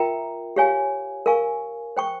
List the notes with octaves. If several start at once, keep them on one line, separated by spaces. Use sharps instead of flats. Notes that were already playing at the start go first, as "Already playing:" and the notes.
Already playing: F4 A#4 E5 G5 A#5
G4 C#5 F5 G#5
A#4 F5 G#5 C#6
C5 G5 C#6